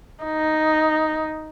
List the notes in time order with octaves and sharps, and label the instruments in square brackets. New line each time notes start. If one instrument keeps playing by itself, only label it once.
[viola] D#4